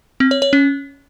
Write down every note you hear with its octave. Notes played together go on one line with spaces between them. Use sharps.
C4
C#5
C#5
C#4